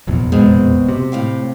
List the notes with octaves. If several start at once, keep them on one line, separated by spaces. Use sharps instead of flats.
F1 A#1 E2
B2 G#3 C4
C3
A2 F5 G5